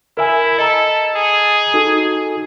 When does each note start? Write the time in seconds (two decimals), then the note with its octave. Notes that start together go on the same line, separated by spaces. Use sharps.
0.17 E4 A#4 E5 G#5
0.58 A4 D#5 A#5
1.16 G#4
1.74 D#4 F#4 A4